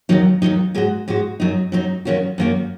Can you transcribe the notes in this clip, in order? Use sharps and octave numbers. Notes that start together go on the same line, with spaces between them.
D#2 D#3 F#3 D#4
D#2 D#3 F#3 D#4
G#2 G#3 F#4
G#2 G#3 F#4
F#2 F#3 D#4
F#2 F#3 D#4
F#2 D#3 A#3 C#4 F#4
F#2 D#3 A#3 C#4 F#4